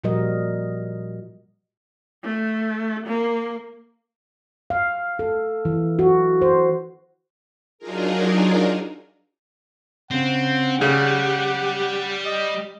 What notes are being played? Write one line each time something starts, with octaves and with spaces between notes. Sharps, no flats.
A#2 F3 G3 F#4 A#4 D#5
A3
A#3
F5
A4
E3
F#4
C5
F#3 D4 D#4 F4 G#4 A#4
C#3 C4 F#5
C#3 G3 G4
D#5